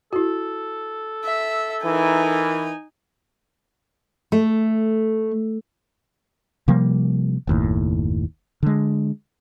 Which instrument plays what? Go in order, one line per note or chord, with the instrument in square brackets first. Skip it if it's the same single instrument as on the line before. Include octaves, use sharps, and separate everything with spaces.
[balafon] E4 F#4 [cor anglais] A4
[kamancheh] E5
[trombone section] E3 A#4 [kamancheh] D#4 G#5
[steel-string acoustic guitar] A3
[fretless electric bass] C3 F3 G3 A#3
F#1 D#2 A2
D3 G#3